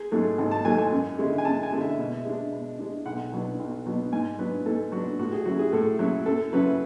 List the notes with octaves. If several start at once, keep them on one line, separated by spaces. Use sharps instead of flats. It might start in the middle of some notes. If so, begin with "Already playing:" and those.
Already playing: G#4
G#2 F#3 A3
G#1
A5
G#2 F#3 A3 G#5
G#5
F#2
D3 G#3 C#4 E4
G#5
F#2 A5
G#5
D3 G#3 C#4 E4
E5
B2
G#3 D4
B2
G#3 D4
B1 F#5
B2 F#3 B3 D4
B1
B2 F#3 B3 D4
G#2 G#5
F#3 B3 D4 B4
G#2 A4
F#3 B3 D4 F#4
A2 F#4
G#4
F#3 C#4 E4 F#4
G#4
A2 A4
F#3 C#4 E4
F#2 A4
C#3 F#3 C#4 E4 B4